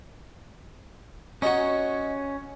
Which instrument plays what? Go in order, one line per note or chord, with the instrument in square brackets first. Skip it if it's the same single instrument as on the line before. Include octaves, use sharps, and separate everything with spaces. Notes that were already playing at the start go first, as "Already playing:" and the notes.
[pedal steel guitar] C#4 C#5 [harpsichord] D#4 F#4